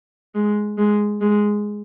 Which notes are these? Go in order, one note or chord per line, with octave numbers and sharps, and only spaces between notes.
G#3
G#3
G#3